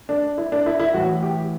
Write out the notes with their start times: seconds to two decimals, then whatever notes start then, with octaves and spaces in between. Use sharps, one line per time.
0.09 D4
0.38 E4
0.52 D4
0.66 E4
0.80 E4
0.94 A2 E3 F#4
1.23 G4